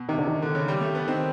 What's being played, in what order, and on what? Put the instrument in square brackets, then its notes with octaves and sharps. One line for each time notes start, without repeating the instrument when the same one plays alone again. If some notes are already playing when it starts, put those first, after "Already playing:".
Already playing: [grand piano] B2
[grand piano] C3 [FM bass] D#3
[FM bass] D3
D#3
[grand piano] D3
C#3
G3
A3
B3
[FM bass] D#3 [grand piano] C4